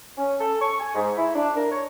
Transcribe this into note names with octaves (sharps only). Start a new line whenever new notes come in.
C#4
A4
C#6
G#5
G#2
E4
D4
A#4
C#5